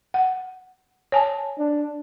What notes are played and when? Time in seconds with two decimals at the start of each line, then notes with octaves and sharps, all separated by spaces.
0.14 F#5
1.12 C#5 G#5 A5
1.58 D4